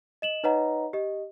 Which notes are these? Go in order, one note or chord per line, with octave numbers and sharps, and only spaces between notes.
D#5 E7 F#7
D#4 B4 C#5 D#5 F#5 A#5
G4 D#5